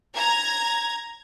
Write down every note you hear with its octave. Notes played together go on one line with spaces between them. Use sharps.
A#5 G#6